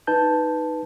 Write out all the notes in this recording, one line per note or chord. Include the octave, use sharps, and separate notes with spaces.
D#4 B4 A5 G6